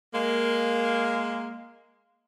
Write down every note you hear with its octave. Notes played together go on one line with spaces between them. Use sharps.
G#3 A#3